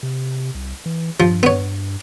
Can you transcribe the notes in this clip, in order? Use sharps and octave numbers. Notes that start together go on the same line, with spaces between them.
C3
C2
E3
G2 F3
B3 C#5